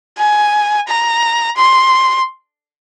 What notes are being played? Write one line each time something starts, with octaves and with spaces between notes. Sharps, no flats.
G#5
A#5
C6